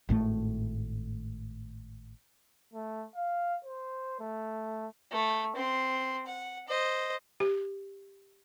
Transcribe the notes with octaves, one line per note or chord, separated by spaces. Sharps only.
G#1 A2 C#3 A3
A3
F5
C5
A3
A3
C4 C6
F#5
C5 D#5
G4